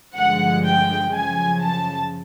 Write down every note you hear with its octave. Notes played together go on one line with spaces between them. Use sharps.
G2 D3 F3 G#3 F#5
G5
F#2 C#3 F3 G#5
A5